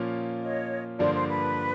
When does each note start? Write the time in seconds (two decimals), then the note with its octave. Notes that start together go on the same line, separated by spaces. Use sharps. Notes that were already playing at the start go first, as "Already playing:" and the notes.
Already playing: A#2 F3 A#3 C#4 F4
0.42 C#5 D#5
0.99 G2 D3 F3 A#3 D4 C5 D5
1.14 C5
1.29 B4